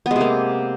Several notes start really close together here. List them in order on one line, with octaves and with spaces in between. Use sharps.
B3 G#3 C3 A#3